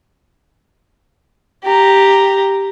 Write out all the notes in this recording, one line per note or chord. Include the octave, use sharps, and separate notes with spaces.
G4 A#5